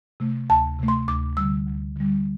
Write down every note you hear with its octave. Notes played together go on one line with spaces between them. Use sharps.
C3 A3
D2 A5
C3 A3
C6
D2 D6
D3 G3 E6
D2
D3 G3